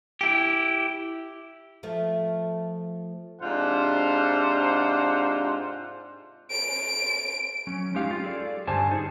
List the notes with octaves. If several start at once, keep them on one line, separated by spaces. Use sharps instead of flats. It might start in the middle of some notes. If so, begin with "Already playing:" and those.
E4 G4
F3 A3
G#2 C3 D4 F4 C5 F#5
D7
F#3 C#4
G#3 C#4 D#4 G4 F5
F4
G#4 A4 D5
G2 D3 G4 C5 G#5 A5
D#4 G#4